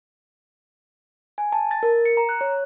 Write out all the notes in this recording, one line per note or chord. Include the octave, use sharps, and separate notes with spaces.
G#5
A5
A6
A#4
C#7
A#5
F#6
C#5